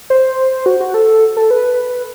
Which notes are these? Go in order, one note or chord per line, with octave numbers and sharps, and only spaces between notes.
C5
F#4
F#4
A4
A4
B4